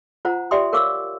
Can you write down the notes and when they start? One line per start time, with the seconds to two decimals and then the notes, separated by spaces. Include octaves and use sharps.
0.25 F4 C5 F#5 A#5
0.51 G4 D5 E5 G5 C6 D#6
0.73 A#4 C#5 F5 C#6 D6 E6